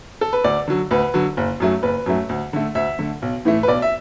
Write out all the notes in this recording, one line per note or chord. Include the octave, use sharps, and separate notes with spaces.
A4
B4
D2 D5
D3 F#3
D2 B4
D3 F#3
F#1
F#2 F#3 A3
F#1 B4
F#2 F#3 A3
D2
D3 A3
D2 E5
D3 A3
B1
A2 E3 A3
B4
B1 D5
E5